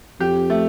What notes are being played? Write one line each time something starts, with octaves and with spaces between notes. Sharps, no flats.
F2 G4
A3